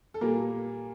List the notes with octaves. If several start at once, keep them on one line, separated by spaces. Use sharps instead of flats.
A4
A#2 G3 A#3 A#4